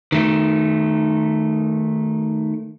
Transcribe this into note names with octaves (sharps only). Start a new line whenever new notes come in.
D#3 A3